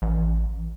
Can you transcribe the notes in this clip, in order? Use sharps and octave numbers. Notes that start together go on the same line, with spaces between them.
A1